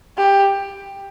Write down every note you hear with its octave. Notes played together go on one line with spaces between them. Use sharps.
G4